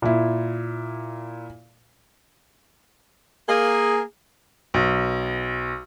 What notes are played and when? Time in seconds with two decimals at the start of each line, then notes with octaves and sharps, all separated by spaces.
0.02 A#2 E4
3.48 A#3 G#4
4.74 B1